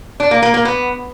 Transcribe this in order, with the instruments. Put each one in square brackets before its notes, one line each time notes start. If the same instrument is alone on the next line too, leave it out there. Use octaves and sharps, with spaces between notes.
[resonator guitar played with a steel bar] D4
A#3
A#3
A#3
B3